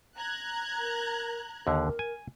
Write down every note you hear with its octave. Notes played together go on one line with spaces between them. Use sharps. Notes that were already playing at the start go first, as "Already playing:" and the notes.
A#5 F#6 G#6
A#4
D#2 D3 A#4
G#5